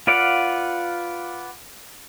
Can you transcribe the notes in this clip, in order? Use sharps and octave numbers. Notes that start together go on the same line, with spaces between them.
F4 B4 D5 F5 F#5